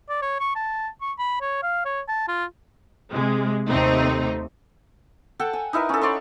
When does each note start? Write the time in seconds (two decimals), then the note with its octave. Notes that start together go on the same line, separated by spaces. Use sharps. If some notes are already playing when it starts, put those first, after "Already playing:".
0.09 D5
0.22 C#5
0.40 C#6
0.55 A5
1.01 C#6
1.18 B5
1.41 C#5
1.63 F5
1.85 C#5
2.08 A5
2.28 F4
3.11 C3 G#3
3.69 D#2 C3 A3 C4 D#4
5.39 A4 F#5 G5 A5
5.53 G#5
5.73 D#4 E4 A#4 B4
5.89 C#4 A4
6.01 C#5 D5 C6 C#6